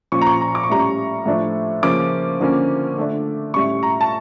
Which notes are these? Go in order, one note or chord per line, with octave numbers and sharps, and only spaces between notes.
A#2 F3 C#4 C#6
A#5
C#6
A#5
D6
C#6
A2 G3 C#4 A#5
C#6
A2 F3 A3 D4
C#3 F3 A#3 C#4 D6
D3 F3 A#3 C#4
D3 A3 D4
A2 G3 C#4 C#6
A#5
A5